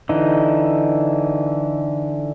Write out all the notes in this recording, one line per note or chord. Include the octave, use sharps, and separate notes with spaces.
D3 E3 D#4